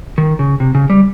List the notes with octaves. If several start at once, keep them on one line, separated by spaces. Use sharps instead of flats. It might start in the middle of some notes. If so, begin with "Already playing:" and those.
D#3
C#3
C3
C#3
G3